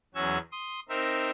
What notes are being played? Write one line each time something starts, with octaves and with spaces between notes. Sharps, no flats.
E2 F#3 C#4 F#4 E6 G#6
C6 D#6
C4 D#4 A#4 E5